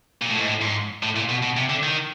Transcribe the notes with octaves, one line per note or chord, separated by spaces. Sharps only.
A#2
A2
G#2
A2
G#2
A2
A#2
B2
B2
C3
D3
D#3